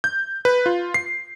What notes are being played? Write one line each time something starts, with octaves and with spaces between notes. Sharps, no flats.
G6
B4
F4
C7